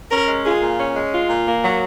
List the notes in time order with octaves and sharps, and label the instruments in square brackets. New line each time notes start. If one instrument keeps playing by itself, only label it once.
[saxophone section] C#4 [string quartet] A#4
[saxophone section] G#3
[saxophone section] F4 [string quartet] G#4
[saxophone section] A#2
C#4
G#3
F4
A#2
A#3
F#3